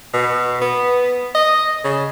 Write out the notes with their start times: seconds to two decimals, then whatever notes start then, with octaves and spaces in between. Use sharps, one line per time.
0.13 B2
0.61 B3
1.35 D#5
1.84 C#3